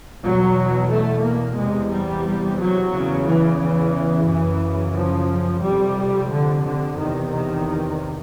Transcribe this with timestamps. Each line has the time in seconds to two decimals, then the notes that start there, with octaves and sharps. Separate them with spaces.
0.23 E2 B2 F#3
0.90 A3
1.24 A#3
1.58 E2 C3 G#3
1.91 G3
2.59 F#3
2.92 E2 C#3
3.26 E3
3.59 E3
4.27 F#2 C#3
4.95 F3
5.61 F2 C3 G3
6.29 D3
6.63 D3
6.96 E2 C3 D#3
7.30 D#3